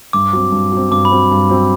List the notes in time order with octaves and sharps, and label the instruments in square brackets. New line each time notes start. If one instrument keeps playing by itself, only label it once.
[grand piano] G2 [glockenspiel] D6
[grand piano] F#3 C4
G2
F#3
C4
[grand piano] G2 [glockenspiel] D6
[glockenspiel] B5
[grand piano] F#3 C4
G2
F#3 C4